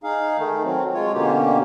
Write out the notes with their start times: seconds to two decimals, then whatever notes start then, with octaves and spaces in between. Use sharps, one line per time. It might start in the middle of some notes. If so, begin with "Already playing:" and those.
0.04 D#4 G#4 F5
0.38 D#3 A3
0.64 F#3 C4
0.94 G#3 F4 C#5
1.14 B2 D3 A#3 C#4 G4